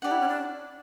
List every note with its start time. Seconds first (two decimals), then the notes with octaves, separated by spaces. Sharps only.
0.02 D4 G4 D5 F#5
0.11 E4
0.20 C#4
0.28 D4